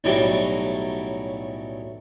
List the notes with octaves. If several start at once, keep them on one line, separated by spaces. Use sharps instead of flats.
B1 A2 E3 F#3 G3 D6